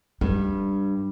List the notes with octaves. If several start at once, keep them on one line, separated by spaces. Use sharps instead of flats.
G2 G3